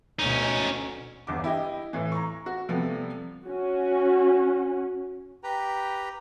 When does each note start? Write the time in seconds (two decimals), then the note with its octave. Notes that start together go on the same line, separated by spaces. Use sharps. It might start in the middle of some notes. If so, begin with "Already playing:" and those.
0.19 D2 B2 C#4 D#4
1.27 G1 E2 D6
1.44 E4 G4 D#5
1.93 A2 E3
2.12 A#5 C#6
2.46 F#4
2.69 C3 F3 G3 A3 B3
3.46 C#4 F#4
5.43 G4 B4 G5 A#5